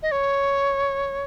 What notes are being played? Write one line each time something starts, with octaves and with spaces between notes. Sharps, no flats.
D#5
C#5